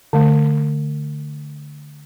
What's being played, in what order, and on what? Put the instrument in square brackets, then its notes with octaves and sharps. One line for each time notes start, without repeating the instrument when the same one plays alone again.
[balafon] D3 A3